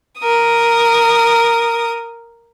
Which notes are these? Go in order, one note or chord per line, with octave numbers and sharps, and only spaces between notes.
A#4 D#6